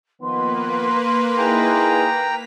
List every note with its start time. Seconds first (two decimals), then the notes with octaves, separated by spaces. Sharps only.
0.22 D#3 F3 A#3 B3 B4 C6
1.38 D#4 E4 G#4 G5 A#5
2.09 B6